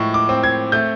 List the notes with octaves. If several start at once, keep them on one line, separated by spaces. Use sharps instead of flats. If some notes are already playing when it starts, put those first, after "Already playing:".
Already playing: A2 F3 G#3 C#6
D6
C4
G#6
A3 G6